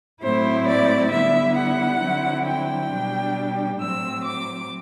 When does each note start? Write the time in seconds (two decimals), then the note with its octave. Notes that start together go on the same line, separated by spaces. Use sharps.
0.22 A2 F#3 A3 C4 E4 C5
0.67 D5
1.11 D3 G3 B3 E4 E5
1.57 F#5
2.01 D3 F#3 C4 E4
2.46 G5
2.90 B2 G3 D4
3.79 A2 F#3 C4 E6
4.24 D6